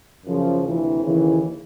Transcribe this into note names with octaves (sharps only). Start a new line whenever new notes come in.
F#2 C#3 F3
D2 C3 E3
D#2 C#3 E3